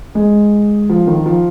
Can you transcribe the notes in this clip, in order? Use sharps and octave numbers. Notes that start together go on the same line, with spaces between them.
G#3
F3
D#3
F3